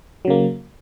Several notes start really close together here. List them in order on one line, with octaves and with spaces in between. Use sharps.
F#3 C#3 A#3